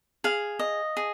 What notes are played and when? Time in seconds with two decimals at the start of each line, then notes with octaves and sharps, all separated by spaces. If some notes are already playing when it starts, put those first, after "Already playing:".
0.24 G#4 F5
0.59 D#5
0.97 G#4